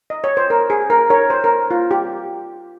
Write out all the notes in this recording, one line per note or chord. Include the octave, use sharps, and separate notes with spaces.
D#5
C#5
C5
A#4
G#4
A#4
A#4 C#5
C5
A#4
F4
G4